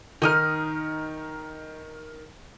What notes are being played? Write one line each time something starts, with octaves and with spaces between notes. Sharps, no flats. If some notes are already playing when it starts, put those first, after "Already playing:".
D#3 D#4 A#4 D#6 F6